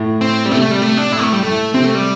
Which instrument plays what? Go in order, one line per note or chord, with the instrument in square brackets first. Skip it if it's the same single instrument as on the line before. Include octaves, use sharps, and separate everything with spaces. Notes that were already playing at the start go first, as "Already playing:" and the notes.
Already playing: [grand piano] A2
[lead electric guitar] C4
G3
[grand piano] C3 [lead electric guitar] A3
[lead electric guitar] A3
G3
A3
D4
[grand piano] A2 [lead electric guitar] E4
[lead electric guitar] A3
G3
[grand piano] A2 [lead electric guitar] A3
[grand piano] C3 [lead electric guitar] C4
[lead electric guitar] A3
G3